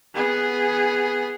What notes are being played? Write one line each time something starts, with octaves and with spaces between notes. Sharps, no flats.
B3 G#4